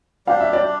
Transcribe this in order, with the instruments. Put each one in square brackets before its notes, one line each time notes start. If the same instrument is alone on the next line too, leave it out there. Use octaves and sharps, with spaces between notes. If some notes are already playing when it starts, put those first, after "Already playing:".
[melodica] G3 D4 G4 [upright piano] F5
[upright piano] E5
D5
[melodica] G3 D4